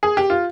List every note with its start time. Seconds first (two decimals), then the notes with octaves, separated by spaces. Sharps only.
0.03 G#4
0.17 G4
0.30 F4